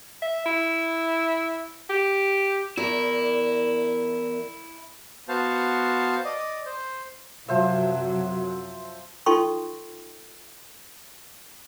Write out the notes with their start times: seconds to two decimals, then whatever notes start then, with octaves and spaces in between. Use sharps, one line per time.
0.22 E5
0.45 E4
1.89 G4
2.77 E2 E4 A#4 D5
5.29 B3 F#4 C5 F5 A5
6.25 D5 D#5
6.66 C5
7.48 F#2 C3 F3 F#3 C5 E5
9.26 D#4 F4 A4 G5 C6 C#6